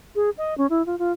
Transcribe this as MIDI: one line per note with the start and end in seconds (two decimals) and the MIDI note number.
0.15 0.30 68
0.38 0.54 75
0.58 0.67 61
0.70 0.85 64
0.86 0.98 65
0.99 1.12 65